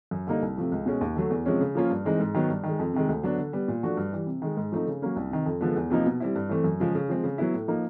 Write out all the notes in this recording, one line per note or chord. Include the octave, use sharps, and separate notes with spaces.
F#2
D3 G3 A#3 D#4
C2
C3 F3 A3
C#2
B2 G#3 C#4
D#2
D3 F#3 A3
E2
C3 F3 G#3 C#4
C#3
F3 A#3 C#4 F4
G2
E3 G#3 C4 D#4
G#2
D#3 F#3 B3
G2
D#3
G#3
F2
C3 D#3 G#3
D2
D3 F#3 B3 D4
D3
G3 B3
A#2
F3 A3 D4 F#4
G2
E3 G3
C3
D#3 G#3
G#2
F3 A3 C4 D#4
C#3
F#3 A#3 C#4
C2
C3 D#3
F2
D3 F3 G#3 B3
E2
C3 F3 A#3 D#4
B2
G3 C4 E4
G2
E3 A3 C4
F#2
C#3 F3 G#3
C#3
F3 G#3 C4
C#3
F#3 B3 E4
A2
F3 A#3 D#4